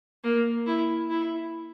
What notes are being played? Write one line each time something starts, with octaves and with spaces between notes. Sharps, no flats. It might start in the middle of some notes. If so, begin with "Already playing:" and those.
A#3
E4
E4